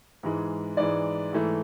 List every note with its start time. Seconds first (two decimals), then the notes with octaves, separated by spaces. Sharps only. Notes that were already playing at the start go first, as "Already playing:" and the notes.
0.23 G#2 E3 G#3
0.77 G#2 E3 G#3 D5
1.33 G#2 E3 A3